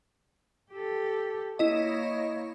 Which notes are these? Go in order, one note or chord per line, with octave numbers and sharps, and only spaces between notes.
G4 A4
A#3 E4 C#5 D#5